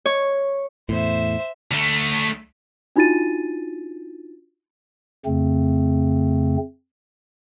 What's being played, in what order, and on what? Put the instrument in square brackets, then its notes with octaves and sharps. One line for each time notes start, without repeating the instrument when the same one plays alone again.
[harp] C#5
[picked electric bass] E2 A2 [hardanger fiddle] C5 E5
[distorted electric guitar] D2 A3
[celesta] D4 D#4 F4 F#4 A6 D#7
[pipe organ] F2 C#3 A3 C4